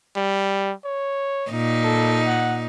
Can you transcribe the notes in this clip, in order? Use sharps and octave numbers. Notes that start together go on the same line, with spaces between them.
G3
C#5
A#2 D#4
A4
F#5